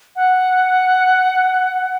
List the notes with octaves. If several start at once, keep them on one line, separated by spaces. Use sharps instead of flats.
F#5